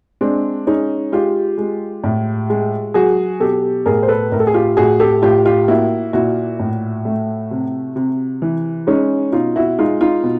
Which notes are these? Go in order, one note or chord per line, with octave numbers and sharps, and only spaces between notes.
G#3 C4 D4
G#3 C#4 D#4
G#3 F4 G4
G#3
A2
G#3
F#3 F#4 G#4
B2 G4 A4
A2 G#4 A#4
C5
A4 B4
A2 A#4
A4
G#4
F4 G4
A2 F#4 G#4
G4 A4
A2 F4 G4
F4 G4
A#3 E4 F#4
A#2 E4 F#4
A2
A3
C3
C3
E3
G#3 C#4 D#4
B2 D#4 F4
E4 F#4
G#3 D#4 F4
D#4 F4
B2